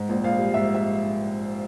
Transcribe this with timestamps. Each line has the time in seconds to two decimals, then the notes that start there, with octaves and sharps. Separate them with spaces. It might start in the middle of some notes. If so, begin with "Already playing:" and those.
Already playing: G#2
0.09 A#1
0.24 A#1 F5
0.39 G3
0.54 G#2 E5
0.75 E5